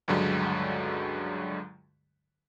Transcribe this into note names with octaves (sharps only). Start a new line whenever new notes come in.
C#2 G2 D3 F#3 G#3